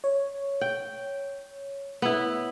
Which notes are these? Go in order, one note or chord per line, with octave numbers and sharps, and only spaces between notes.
C#5
G5
B3 E4